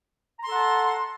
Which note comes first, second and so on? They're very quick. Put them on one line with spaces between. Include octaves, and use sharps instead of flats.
A#5 C6 A4 F#5 A5